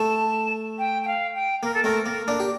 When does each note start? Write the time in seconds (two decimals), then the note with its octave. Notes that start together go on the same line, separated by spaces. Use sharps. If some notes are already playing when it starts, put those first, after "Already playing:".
Already playing: A3 A5
0.78 G5
1.02 G5
1.07 F5
1.35 G5
1.63 A#3 A#4
1.74 A4
1.83 A3 C4 A#4
2.05 A#3 A#4
2.28 A#3 D4
2.40 G4